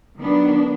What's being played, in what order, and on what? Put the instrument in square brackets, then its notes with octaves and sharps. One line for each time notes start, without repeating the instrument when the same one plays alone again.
[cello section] D#3 F#3 B3 D4